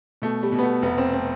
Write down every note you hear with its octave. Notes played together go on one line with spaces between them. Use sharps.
B2 A3
G3
B2
B3
A3
F1 B3
C4
C4